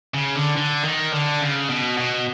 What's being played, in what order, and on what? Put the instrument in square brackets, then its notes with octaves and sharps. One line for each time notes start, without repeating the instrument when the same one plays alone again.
[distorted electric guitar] C#3
D3
D3
D#3
D3
C#3
B2
B2